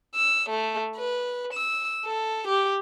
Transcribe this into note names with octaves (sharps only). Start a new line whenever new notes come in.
E6
A3
B4
E6
A4
G4